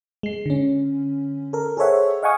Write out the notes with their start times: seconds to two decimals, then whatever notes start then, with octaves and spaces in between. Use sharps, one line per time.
0.23 G#3 C7
0.46 D3 C#4
1.53 A4 A#4
1.77 G#4 A4 C5 C#5 E5 F#5
2.23 D#5 F5 F#5 G#5 C#6 D#6